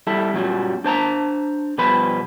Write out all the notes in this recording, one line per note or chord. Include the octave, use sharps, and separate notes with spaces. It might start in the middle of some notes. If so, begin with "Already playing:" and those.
G3 E4 A4
F#2 A#2 F#3 G3
D4 C5 A5 A#5
B2 F3 G3 B4 C5 B5